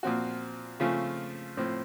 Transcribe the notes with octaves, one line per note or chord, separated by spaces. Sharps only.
A#2 F3 C4 F#4
C#3 F3 A3 C4 F4
A2 F3 C4